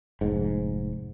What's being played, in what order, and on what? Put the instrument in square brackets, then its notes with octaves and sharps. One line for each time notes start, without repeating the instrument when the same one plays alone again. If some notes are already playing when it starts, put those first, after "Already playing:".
[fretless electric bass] F1 G#2